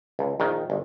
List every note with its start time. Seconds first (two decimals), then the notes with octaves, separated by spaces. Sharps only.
0.19 C#2
0.40 A#1 D#3
0.70 G1